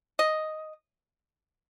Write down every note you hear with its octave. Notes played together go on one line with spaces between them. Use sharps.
D#5